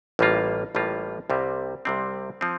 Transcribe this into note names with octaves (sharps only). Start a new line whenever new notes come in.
A1 A2 G3 A#3 F4
A1 A2 G3 A#3 F4
C2 C3 G3 C4
C2 C3 G3 C4
F3 C4